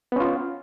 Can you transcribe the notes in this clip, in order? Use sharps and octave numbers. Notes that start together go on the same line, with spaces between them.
B3 C#4 F4